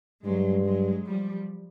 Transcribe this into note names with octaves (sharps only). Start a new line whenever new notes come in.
G2 F#3 G#3
F#3 G#3
F3 G3